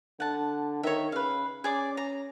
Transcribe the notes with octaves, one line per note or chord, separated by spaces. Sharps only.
D3 F#5 A5
D#3 C#5 D#5 E5
C#3 B4 F5
C#4 G#4 D5 D6
A#5